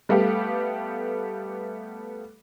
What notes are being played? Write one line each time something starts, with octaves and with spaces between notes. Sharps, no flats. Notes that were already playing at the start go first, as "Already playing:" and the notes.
G3 A3 B3 G4 F5